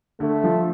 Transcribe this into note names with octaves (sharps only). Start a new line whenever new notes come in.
D3 A3
F3